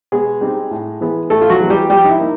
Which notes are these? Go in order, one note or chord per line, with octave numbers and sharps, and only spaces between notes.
B2 G#3 G#4
G3 C4 D#4
A2
E3 G#3 B3
A2 A3 A4
F4
F#3 F#4
E3 G#3 B3
G3 G4
F3 G3 G4
D#4
E4
A#3 D#4